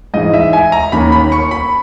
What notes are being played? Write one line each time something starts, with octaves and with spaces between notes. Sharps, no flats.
G#2 E3 G#3 D#4 D#5
E5
G#5
A#5
D#2 D#3 A#3 C#4 B5
B5
C#6
B5